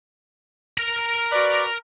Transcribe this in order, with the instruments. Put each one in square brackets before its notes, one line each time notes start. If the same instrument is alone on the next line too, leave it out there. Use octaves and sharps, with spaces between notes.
[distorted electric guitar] A#4 A#5
[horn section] F#4 B4 D5